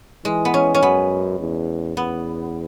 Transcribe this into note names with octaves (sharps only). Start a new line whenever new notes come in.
E3 G#3
B3
C#4
C#4
F#2 B3
E2
E2 B3